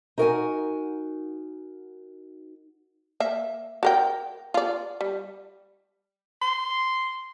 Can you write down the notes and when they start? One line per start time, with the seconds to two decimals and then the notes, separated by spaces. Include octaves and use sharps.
0.18 D#4 F#4 A#4 F5 F#5 G#5
3.20 A#3 E5
3.83 F#4 A#4 G5
4.54 F4 D5
5.01 G3
6.42 C6